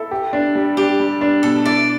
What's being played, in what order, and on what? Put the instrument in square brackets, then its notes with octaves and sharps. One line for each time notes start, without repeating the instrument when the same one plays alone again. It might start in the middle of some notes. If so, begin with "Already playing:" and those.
Already playing: [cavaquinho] E4 [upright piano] A4
[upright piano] G4
D4
G3
[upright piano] D4 [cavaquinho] G4
[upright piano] G3
D4
[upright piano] B2 [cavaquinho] A4
[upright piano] E4 [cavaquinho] D5